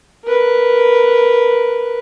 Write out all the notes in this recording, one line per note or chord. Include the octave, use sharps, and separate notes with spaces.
A#4 B4